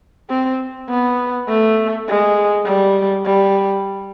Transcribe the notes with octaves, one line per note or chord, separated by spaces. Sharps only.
C4
B3
A3
G#3
G3
G3